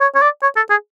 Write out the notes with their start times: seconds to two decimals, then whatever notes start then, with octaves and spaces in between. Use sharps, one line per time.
0.01 C#5
0.15 C#5
0.22 D5
0.42 C#5
0.56 A4
0.70 G#4